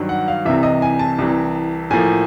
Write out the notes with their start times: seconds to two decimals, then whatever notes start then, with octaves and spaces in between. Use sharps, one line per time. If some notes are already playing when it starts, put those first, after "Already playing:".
Already playing: G2 D#3 F#3
0.09 F#5
0.28 F5
0.45 C2 C3 E3 E5
0.63 D#5
0.82 G#5
0.99 A5
1.18 C2 C3 E3
1.91 A2 F3 A#3 G#5